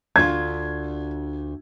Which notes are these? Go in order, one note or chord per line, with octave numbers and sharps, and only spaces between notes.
D2 D4 F4 G#6